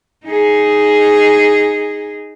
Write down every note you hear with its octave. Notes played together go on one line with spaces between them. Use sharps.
D#4 G#4